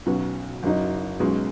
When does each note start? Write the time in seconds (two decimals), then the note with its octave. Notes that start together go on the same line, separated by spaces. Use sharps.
0.06 B1 B2 F#3 C#4 F#4
0.63 F#1 F#2 F#3 D#4
1.20 B1 B2 G#3 C#4